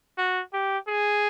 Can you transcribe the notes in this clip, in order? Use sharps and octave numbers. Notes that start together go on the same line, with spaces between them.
F#4
G4
G#4